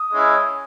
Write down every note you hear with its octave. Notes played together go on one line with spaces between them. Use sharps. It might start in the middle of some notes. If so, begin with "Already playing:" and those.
Already playing: D#6
G#3 C#4 E4